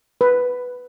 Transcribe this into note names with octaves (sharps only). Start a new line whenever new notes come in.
B4